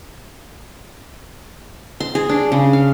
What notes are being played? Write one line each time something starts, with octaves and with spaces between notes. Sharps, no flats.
C6
G#4
D4
C#3
F5